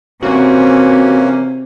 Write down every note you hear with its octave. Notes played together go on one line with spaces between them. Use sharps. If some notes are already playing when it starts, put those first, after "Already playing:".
C3 E3 A#3 C#4 F#4